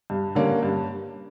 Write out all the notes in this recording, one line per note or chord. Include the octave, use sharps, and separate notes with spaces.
G2
D3 G3 A#3 C#4
G2